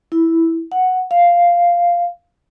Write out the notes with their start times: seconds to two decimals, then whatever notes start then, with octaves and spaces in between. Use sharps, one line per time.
0.12 E4
0.72 F#5
1.11 F5